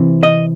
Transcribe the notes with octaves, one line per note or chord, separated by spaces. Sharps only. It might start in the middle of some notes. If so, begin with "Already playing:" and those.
Already playing: C3 E3 C4
D#5